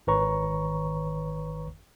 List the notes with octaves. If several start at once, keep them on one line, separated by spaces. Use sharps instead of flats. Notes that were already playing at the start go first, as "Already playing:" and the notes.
G#1 D#3 B4 C#5 A#5 C#6